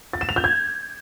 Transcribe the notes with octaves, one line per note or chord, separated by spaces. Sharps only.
A6
E7
F7
G6
G#6